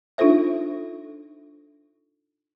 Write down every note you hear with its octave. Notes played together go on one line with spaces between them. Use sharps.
D4 D#4 F4 A4 C5 E5